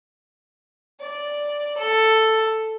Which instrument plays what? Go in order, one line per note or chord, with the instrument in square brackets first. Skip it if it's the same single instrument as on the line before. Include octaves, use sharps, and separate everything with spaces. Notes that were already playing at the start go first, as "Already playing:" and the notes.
[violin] D5
A4